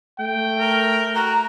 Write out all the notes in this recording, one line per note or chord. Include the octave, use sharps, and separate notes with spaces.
A3 G5
A#4
F#4 A#5